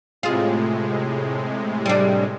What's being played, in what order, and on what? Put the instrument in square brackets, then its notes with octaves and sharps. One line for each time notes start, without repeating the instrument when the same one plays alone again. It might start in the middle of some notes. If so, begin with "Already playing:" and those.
[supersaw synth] A2 C3 G#3 [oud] F4 G#4
[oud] G3 D4